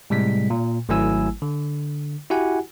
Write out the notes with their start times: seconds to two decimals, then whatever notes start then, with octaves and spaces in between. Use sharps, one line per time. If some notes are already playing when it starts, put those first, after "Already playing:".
0.10 A2 C3 G3 G#3 B6
0.50 A#2
0.89 G#1 F#3 A3 E4 G#5 E6
1.42 D3
2.30 E4 F#4 G4 F#5 G#5